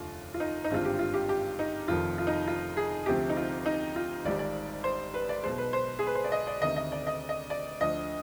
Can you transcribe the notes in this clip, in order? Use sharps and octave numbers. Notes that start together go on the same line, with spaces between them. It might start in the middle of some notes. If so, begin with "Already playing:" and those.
Already playing: F1 D#2 D3 F4
F4
D#4
D#4
G#1 G2 D3 G#3 C4 F4
G4
F4
G4
G4
D#4
F1 F2 D#3 F4
F4
D#4
F4
G#4
D2 C3 F3 C4 G4
D#4
F4
D#4
F4
G#1 G#2 G3 D5
D5
C5
B4
D5
B1 B2 G#3 C5
B4
C5
G#4
B4
C5
D5
D#5
D5
D2 C3 D#3 D#5
D#5
D5
D#5
D#5
D5
D2 D3 F3 D#5